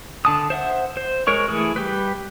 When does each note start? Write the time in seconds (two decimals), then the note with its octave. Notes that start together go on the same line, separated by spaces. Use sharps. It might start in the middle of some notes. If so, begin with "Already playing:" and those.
0.25 D3 A5 D#6
0.50 C5 E5 F#5
0.97 C5
1.27 G#3 A#4 C#5 C#6
1.48 E3 A3 G#4
1.76 G3 G4 B4